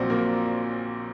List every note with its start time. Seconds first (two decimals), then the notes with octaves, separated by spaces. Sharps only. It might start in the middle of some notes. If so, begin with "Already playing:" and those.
Already playing: A#1 A#2 F#3 C4
0.10 A#3 A#4